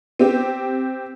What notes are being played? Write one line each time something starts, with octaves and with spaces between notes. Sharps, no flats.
C4 G4